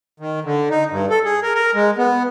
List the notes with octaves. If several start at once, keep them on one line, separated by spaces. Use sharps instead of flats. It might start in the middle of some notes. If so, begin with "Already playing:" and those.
D#3
D3
D#4
G2
A4
G#4
A#4
A#4
G#3
B3